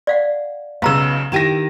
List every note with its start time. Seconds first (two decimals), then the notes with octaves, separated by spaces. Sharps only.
0.07 D5 F5 F#5
0.82 B1 C#3 B3 F5 A#5 E6
1.32 D#3 E4 G4 A#6 D#7 E7